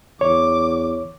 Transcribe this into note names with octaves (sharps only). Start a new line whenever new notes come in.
E2 C#5 D6